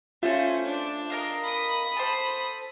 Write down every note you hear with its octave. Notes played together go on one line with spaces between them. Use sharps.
A3 C#4 F4 C5
D4
A#4 D#5 F5
B5 D#6
A4 C5